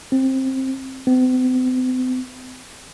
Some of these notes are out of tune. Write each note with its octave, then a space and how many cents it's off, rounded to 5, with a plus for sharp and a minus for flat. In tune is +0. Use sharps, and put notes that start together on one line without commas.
C4 +15
C4 -45